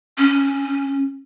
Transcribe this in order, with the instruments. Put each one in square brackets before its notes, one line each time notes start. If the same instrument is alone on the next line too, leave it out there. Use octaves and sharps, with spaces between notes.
[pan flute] C#4